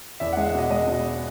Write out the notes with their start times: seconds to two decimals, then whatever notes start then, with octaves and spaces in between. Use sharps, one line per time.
0.20 E2 E5
0.33 F#5
0.37 G#3
0.46 F#5
0.54 B2 D#5
0.71 G#3 D#5
0.88 B2